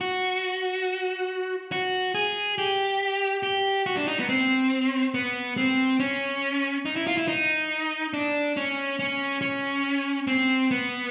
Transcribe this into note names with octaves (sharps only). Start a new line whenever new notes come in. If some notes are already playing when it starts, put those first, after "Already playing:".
F#4
F#4
G#4
G4
G4
F#4
D4
D#4
B3
C4
B3
C4
C#4
D#4
E4
F4
E4
D#4
D4
C#4
C#4
C#4
C4
B3